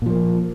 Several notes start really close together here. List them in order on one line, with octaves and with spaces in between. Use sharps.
A#2 F3 A#3